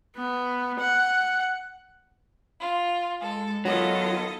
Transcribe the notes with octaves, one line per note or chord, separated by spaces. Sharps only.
B3
F#5
F4
G#3 A4
D#3 F#3 B3 F4 A4 D#5